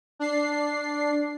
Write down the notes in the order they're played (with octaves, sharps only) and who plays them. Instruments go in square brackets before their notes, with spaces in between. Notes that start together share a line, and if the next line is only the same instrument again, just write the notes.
[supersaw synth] D4 C7